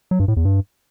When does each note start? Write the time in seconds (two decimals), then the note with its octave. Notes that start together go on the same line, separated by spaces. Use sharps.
0.11 F#3
0.20 G2
0.28 A2
0.37 E2
0.45 G2